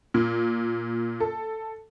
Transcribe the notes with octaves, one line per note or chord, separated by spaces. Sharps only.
A#2
A4